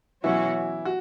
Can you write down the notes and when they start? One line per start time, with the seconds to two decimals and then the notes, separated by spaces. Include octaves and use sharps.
0.23 B2 E3 F#3 C#4 E4 F#4
0.85 F#4